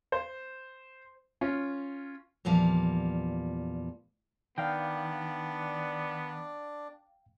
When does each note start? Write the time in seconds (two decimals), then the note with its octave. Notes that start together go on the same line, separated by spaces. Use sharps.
0.12 C5
1.41 C#4 F4
2.45 E2 A#2 F3 G3 F5
4.58 D#3 B3 D4 D5 F5 G5